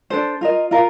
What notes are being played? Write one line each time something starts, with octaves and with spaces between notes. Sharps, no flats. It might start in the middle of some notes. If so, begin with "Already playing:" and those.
D4 A4 C5
F4 A#4 D#5
F4 A#4 F5